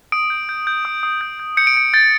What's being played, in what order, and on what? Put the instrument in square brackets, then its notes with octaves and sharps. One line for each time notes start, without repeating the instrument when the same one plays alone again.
[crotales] D#6 D7
G6
G6
G6
D#6
D#6
G6
G6
G6 C#7
D7
G6 C#7
G6 A6